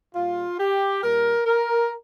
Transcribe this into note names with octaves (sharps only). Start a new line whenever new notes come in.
A#2 G3 F4
G4
A#2 G3 A#4
A#4